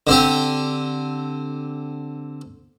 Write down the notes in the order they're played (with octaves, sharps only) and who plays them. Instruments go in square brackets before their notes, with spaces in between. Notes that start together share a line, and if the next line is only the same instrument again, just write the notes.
[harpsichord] D3 C4 G4